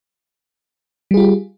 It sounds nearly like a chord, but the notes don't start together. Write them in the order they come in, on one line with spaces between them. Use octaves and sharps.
G3 G#4 F4 G4